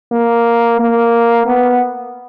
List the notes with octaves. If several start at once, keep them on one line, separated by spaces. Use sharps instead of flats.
A#3
A#3
B3